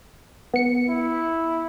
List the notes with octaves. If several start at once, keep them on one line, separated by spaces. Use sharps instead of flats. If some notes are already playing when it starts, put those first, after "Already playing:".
B3 C#7
E4